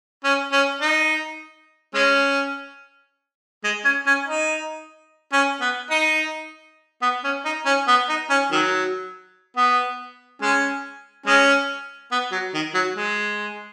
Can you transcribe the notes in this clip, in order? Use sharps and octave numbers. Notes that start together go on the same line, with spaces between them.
C#4
C#4
D#4
G#3 C#4
G#3
C#4
C#4
D#4
C#4
B3
D#4
B3
C#4
D#4
C#4
B3
D#4
C#4
D#3 F#3
B3
G#3 C#4
G#3 C#4
B3
F#3
D#3
F#3
G#3